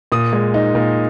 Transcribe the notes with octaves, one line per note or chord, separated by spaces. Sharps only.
A#2 D#6
G#3
D#4
A#2